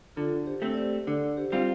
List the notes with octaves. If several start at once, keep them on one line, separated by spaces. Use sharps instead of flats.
D3 F4 A4
G4 C5
A3 C4
D5
G4 C5
D3 A4 D5
G4 C5
G3 C4 F4